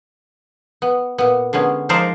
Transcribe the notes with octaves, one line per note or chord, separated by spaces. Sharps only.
B3
A#2 B3
D3 G#3 B3 C#4
F3 G#3 D#4 A#4 C5 D5